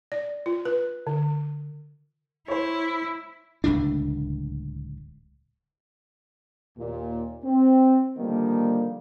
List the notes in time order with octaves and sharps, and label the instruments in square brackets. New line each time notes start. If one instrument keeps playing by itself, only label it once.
[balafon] D5
F4
B4
D3
[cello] E4 [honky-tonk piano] C5 C#5
[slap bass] D1 C#2 A2 D4
[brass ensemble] D#2 A#2
C4
D3 D#3 F3 G3 A#3